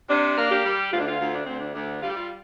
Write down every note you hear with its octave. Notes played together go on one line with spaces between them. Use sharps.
C3 D4
A#3
G4
G3
D2 F4
D4
F4
D2
D4
D2 C4
D4
D2 D4
G3 F4
G4
F4